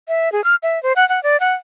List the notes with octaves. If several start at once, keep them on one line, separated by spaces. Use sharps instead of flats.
E5
G#4
F6
E5
C5
F#5
F#5
D5
F#5